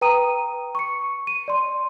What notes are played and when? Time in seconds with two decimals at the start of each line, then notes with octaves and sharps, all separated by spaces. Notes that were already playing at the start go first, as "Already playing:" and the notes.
0.01 B4 G5 A#5 D#6 D#7
0.75 C#6 C#7
1.27 D#7
1.48 D5 C6